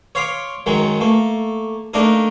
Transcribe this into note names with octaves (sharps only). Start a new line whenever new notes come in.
C#5 F5 C6 D6
F#2 D#3 F#3 G#3
A3 A#3
A3 A#3 D4 D#4 A#4